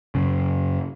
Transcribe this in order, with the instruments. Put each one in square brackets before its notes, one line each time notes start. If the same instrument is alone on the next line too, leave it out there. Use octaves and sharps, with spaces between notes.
[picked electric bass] F#2 C#3